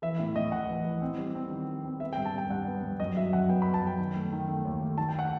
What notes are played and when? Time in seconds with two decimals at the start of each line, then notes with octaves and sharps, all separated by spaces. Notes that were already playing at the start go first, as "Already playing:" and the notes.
0.02 E3 E5
0.18 A2 E5
0.36 A2 D#5
0.52 A2 F#5
0.69 E3
0.85 E3
1.02 C4
1.18 G3
1.35 C4
1.51 D#3
1.68 G3
1.85 C4
2.00 B3 E5
2.13 G5
2.17 G2
2.25 A5
2.34 G2 G5
2.50 G2 F#5
2.67 B3
2.83 G2
3.00 F#2 D#5
3.17 F#3 E5
3.33 F#2 F#5
3.49 B3 G5
3.62 B5
3.66 B3
3.74 A5
3.83 F#2 G5
3.99 D#3
4.16 A3
4.33 D#3
4.48 A3
4.65 D#2
4.82 A3
4.98 D#3 A5
5.09 G5
5.19 F#5